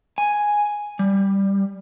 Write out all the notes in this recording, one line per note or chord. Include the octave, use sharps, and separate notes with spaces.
G#5
G3